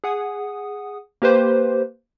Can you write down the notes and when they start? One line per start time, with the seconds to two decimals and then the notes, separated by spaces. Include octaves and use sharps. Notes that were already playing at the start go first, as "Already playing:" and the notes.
0.04 G#4 F#5 D#6
1.22 A#3 G4 B4 C5